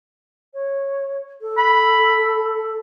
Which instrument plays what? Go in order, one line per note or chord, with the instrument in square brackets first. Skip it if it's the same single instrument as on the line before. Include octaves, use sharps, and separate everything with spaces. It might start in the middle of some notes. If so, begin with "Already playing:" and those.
[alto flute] C#5
A4
[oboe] B5